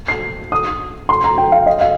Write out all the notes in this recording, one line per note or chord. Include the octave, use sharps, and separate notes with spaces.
C7
D#6
C6
A#5
G5
F5
D#5
F5